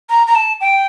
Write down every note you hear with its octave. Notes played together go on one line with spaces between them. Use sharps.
A#5
A#5
A5
G5